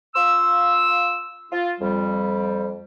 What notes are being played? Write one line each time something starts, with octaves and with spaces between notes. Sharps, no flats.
F4 F5 C6 E6
F4
F2 G3